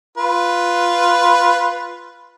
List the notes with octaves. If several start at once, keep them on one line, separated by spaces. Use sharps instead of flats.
F4 B4